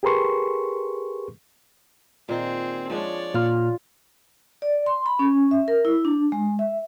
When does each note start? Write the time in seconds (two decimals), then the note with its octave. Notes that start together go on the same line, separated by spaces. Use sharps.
0.03 G4 G#4 A#4 B4 C6 C#6
2.29 A#2 D#3 C4 G#4
2.90 F3 G#3 D4 C#5 D5
3.34 A#2 F4 F6
4.62 D5
4.86 C6
5.06 B5
5.19 C#4
5.51 E5
5.68 A#4
5.85 E4
6.05 D4
6.32 G#3
6.59 E5